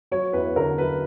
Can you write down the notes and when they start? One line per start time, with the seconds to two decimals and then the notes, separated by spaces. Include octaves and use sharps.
0.11 F#3 C#5
0.33 E2 B4
0.56 D3 A#4
0.78 F#3 B4